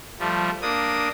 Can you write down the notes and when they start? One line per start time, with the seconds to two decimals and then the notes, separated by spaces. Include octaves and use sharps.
0.19 F3 G3 A3
0.62 A#3 D4 D#6